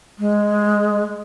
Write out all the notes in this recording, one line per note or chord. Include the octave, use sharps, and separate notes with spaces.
G#3